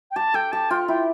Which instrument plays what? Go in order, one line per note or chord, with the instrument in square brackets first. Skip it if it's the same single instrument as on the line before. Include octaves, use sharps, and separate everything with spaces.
[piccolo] G5
[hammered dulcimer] G4 [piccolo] A5
[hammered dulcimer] A4 [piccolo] G5
[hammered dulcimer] G4 [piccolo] A5
[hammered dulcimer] F4 [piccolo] G5
[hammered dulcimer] E4 [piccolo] G5